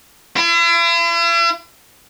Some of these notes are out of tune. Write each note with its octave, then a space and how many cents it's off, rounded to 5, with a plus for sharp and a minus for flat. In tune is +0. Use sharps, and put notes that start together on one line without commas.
E4 +45